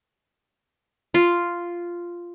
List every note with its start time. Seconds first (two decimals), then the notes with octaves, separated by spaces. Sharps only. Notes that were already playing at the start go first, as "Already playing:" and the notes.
1.14 F4